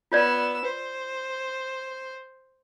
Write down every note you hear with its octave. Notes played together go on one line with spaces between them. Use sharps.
B3 F4 C#5 D5 E6
C5